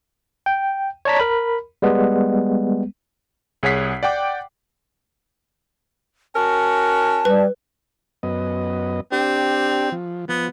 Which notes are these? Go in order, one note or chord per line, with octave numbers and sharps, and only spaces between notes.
G5
C#5 D5 A5 A#5 B6
A#4 B5
G3 G#3 B3
C2 G#4 C#5 F#5 B6 C7
D5 F#5 G5 D6
C#4 F#4 A#4 A5
G3 B4
F#2 B3 D#5
C4 D4 G4
F3
F3 B3